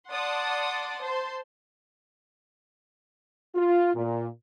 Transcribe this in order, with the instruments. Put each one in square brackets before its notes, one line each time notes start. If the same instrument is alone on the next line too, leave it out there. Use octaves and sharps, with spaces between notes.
[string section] D5 F#5 A5 C6 D#6
C5 A5 C6
[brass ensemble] F4
A#2